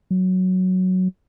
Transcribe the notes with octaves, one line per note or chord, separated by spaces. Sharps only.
F#3